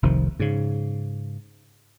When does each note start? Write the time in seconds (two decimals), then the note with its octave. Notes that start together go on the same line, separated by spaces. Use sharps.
0.03 F1 C2 D#3 F3
0.40 G#2 C#3